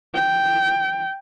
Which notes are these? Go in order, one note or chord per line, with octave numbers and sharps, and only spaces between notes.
G5